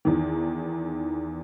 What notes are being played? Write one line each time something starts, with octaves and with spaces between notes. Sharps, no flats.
E2 D#3